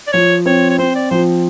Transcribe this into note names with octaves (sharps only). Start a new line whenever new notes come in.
D5
F3 C#5
C4 C#5
C#5
C4 C5
D5
F3 C5